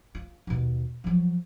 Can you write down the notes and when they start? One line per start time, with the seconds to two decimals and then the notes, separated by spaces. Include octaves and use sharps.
0.15 F4
0.47 D#2 B2
1.04 F3 F#3